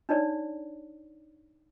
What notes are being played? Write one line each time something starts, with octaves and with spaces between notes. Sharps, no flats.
D4 D#4 C#5 D5